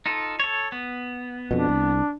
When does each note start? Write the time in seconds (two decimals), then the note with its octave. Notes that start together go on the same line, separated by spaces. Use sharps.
0.06 D#4 F4 A4
0.40 A4 C#5
0.72 B3
1.51 F2 B2 D4
1.68 C2